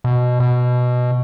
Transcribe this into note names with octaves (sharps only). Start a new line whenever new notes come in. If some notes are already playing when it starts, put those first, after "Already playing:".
B2
B2